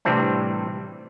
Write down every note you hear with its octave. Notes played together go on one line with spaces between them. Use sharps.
A2 C3 E3 G3 C4 D4